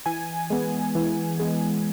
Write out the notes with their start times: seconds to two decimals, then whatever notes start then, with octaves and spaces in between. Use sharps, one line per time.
0.06 E3 G#5
0.50 G#3 B3
0.95 E3
1.40 G#3 B3